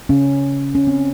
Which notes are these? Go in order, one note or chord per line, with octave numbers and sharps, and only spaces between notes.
C#3 C#4
C#4
C4